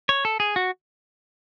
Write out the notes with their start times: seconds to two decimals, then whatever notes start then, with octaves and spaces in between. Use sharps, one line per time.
0.09 C#5
0.25 A4
0.40 G#4
0.56 F#4